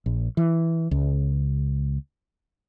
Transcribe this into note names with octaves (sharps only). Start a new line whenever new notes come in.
A#1
E3
C#2